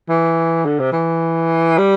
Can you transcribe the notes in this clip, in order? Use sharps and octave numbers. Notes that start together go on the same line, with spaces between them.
E3
D3
C3
E3
G3